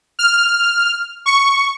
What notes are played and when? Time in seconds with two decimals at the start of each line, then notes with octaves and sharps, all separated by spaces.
0.19 F6
1.26 C#6